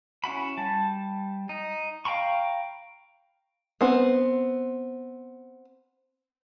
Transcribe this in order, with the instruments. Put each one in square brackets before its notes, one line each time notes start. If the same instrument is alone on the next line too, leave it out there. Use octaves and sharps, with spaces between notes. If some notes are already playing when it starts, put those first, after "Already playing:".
[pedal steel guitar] C#4 E4 F#4 B5
G3 A5
D#4
F5 G5 A#5 B5 C#6
[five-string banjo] B3 C4 B4